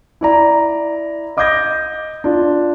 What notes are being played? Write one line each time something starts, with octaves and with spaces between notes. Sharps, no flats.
E4 D5 A#5
D#5 D6 D#6 G6 G#6 A#6
D4 F4